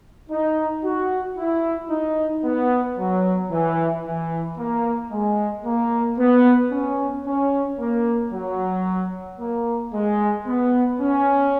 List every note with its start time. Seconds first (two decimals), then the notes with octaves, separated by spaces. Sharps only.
0.30 D#4
0.84 F#4
1.37 E4
1.90 D#4
2.44 B3
2.98 F#3
3.51 E3
4.05 E3
4.58 A#3
5.12 G#3
5.65 A#3
6.19 B3
6.72 C#4
7.26 C#4
7.79 A#3
8.32 F#3
9.40 A#3
9.93 G#3
10.46 B3
11.00 C#4